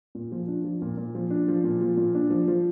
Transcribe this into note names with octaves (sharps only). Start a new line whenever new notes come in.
A#2
F3
D4
F3
A#2
A#2
F3
D4
F3
A#2
F3
A#2
D4
F3
F3